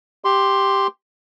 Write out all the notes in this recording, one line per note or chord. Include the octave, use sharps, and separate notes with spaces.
G4 C6